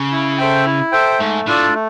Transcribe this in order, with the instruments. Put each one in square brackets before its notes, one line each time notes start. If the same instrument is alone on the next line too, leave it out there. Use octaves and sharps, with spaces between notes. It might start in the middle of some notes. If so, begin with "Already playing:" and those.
Already playing: [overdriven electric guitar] C#3
[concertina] E4
A4 C5 E5 G5
E4
A4 C5 E5 G5
[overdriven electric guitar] G#2 [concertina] A3
[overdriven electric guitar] A2 [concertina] D4 F4 A4 D5
[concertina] A3